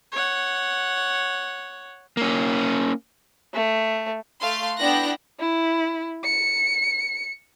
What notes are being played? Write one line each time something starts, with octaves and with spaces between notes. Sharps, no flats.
C#5 F#5
A#3 C#4
A3
A3 F5 C6
B3 D4 E4 G5 F#6 A#6
E4
C#7